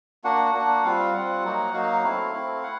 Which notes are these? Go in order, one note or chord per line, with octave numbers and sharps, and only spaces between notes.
A#3 D4 F#4 F#5
A#3 D4 F#4
G3 C4 F4 F5
G3 C4 F4 F#5
F#3 A#3 D#4 F#4
F#3 A#3 D#4 F#4 F5
A3 C4 E4
A3 C4 E4
E4 F#5